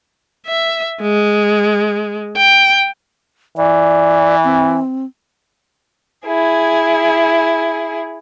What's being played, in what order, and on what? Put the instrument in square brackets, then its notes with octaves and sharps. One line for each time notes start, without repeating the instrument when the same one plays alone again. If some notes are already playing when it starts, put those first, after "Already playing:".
[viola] E5
G#3
G5
[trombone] E3 [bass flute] D5
[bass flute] C4
[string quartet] E4 G#4